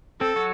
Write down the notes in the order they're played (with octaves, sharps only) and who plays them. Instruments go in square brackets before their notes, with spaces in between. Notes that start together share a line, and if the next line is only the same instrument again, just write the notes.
[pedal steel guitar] C4 [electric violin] A4
[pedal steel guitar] F#3 F#4